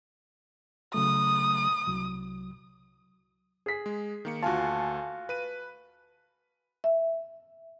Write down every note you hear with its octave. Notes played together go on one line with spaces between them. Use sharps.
C#3 F#3 A3 D#6
C2 F#3
G#4 B6
G#3
D#3 A#3 C#7
D2 F4 F#4 G#5 A5
B4 D#7
E5